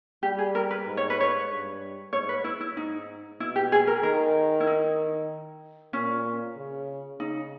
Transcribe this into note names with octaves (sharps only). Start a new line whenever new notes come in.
G3 G4
G#4
A#4
B4
G#2
C#5
B4
C#5
G2
G#2 C#5
B4
E4
E4
G#2 D#4
B2 E4
G4
G#4
A#4
D#3 A#4
E4
D#4
A#2 C#4
C#3
C#3 D#4